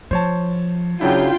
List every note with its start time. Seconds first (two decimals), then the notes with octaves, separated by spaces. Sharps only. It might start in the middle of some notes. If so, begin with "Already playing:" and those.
0.11 F3 C5 C#5 A5
1.01 C#3 F#3 D4 E4 F4 G5